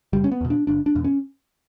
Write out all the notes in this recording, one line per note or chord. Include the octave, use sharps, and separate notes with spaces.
F#1 G3
C#4
B3
E2 B2
D4
F#1 D4
D4
E2 B2
C#4